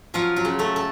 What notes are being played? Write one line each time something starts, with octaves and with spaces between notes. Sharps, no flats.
F3 F#3 F4
F#3 F#4
C#3
A3 A4
A4